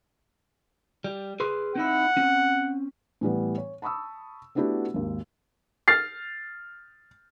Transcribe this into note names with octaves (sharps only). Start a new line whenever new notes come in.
G3
G#4 B4 C6
C4 D#4 E4 F#5
C4 C#4
A2 E3 G3 B3
C#5
A5 B5 C#6 D#6 E6
A3 B3 D4 E4 F#4 G4
G#1 D#2
F6 A6 C7